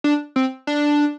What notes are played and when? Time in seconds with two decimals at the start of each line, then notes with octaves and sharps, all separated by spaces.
0.04 D4
0.36 C4
0.67 D4